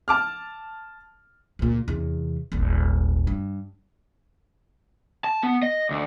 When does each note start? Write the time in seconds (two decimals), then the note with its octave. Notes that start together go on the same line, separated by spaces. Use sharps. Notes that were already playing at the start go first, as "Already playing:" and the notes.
0.08 A5 D6 F6
1.59 C#2 A#2
1.88 E2 C3
2.52 D#1 G#1
3.27 G2
5.24 A5
5.43 B3
5.63 D#5
5.90 D2